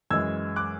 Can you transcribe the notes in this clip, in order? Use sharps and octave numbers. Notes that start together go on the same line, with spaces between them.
F#2 E3 G#3 E6 G#6
D6 F#6